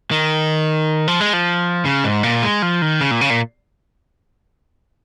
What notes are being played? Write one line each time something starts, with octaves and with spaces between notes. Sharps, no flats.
D#3
F3
G#3
F3
C#3
G#2
A#2
G#3
F3
D#3
C#3
A#2
C#3
A#2